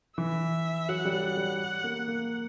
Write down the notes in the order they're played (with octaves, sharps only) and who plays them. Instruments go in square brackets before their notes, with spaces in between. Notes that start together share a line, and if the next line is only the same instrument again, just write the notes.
[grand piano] E3 [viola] E5
[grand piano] F#3 [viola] F#5
[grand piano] G3
F#3
G3
A#3
A#3